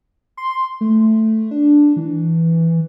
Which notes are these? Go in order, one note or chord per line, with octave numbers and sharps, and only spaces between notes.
C6
A3
D4
E3